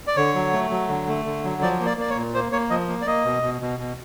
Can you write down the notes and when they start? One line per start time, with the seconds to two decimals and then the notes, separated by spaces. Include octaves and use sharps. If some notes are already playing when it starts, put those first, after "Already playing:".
0.07 D5
0.17 D3 C#5
0.35 F#3
0.53 A3
0.71 F#3
0.89 D3
1.07 A3
1.25 D3
1.44 F#3
1.62 F3 D5
1.80 A#3
1.86 D5
1.98 A#3 D5
2.10 C#5
2.16 A#2
2.34 A#3 C5
2.52 A#3 C#5
2.70 F3 D#5
2.88 A#3
3.02 D5
3.07 A#3 D#5
3.25 B2
3.42 B2
3.61 B2
3.79 B2